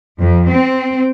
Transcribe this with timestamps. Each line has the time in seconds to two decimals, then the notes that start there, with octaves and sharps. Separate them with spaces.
0.21 F2
0.51 C4